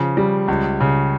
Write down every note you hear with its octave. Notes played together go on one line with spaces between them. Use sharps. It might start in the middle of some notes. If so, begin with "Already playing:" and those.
Already playing: C#3 F3
G3
C#2
C#3